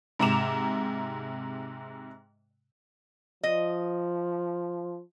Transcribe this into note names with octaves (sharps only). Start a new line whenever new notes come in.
G#2 C3 A#5 D6 E7 F7
F3 D#5